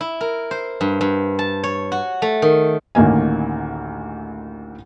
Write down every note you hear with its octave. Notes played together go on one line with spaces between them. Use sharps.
E4
A#4
C5
G2
G2
A5
C#5
F#4
A3
D#3
A1 D2 D#3 A#3 G#5